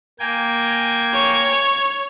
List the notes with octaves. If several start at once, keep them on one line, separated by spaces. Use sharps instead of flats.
A#3 G5 G#5
C#5